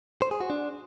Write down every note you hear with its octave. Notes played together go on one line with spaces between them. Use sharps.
C5
G#4
F#4
D4